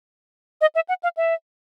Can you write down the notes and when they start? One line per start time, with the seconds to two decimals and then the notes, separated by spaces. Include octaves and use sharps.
0.61 D#5
0.75 E5
0.89 F#5
1.03 F5
1.17 E5